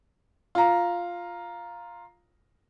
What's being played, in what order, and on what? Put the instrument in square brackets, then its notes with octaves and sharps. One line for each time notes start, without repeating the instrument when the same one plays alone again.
[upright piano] F4 A#5